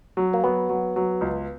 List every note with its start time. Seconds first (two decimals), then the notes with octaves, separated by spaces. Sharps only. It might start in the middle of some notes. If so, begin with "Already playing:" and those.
0.17 F#3
0.33 A#3
0.44 F#3 B3
0.69 F#3
0.96 F#3
1.21 C#2